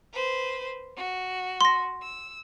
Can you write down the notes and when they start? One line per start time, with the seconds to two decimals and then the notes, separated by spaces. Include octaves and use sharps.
0.11 B4 C5
0.95 F#4
1.61 C6 A#6
2.02 E6